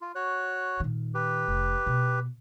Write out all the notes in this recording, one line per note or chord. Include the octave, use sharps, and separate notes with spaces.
F4
F#4 C#5 F#6
A#2 D#3
G4 B4
F1
B2